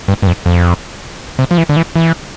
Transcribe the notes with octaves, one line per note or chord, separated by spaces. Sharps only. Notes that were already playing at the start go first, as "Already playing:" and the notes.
G2
G2
F2
F2
C3
F3
E3
D3
E3
E3